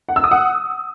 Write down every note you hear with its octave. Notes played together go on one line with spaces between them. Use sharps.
F#5
E6
D#6
F#5